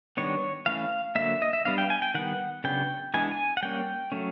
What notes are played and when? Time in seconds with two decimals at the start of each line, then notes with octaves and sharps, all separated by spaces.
0.17 D#3 G3 B3 D4 C#5
0.66 E3 A3 C#4 F5
1.15 D3 F#3 A#3 E5
1.42 D#5
1.53 E5
1.65 G3 B3 D4 F5
1.78 G5
1.90 G#5
2.02 G5
2.14 D#3 G3 B3 F#5
2.64 C#3 F#3 B3 D4 G5
3.14 E3 G#3 B3 D4 G#5
3.31 G#5
3.57 F#5
3.63 G3 A#3 C#4 G5
4.12 F#3 A3 C#4